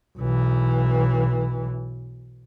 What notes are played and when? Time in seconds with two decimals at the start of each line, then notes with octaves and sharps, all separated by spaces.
0.18 B1 E3